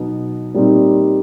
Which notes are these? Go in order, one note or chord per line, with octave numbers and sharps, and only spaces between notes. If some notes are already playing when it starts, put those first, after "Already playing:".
Already playing: B2 F#3 B3 D#4
A#2 G3 C4 D#4